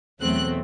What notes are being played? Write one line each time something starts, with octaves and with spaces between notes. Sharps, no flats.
E2 B2 F#3 A3 C4 F#6